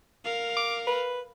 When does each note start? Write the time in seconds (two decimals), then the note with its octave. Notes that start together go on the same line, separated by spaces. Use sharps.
0.25 A#4 F5
0.57 D6
0.87 B4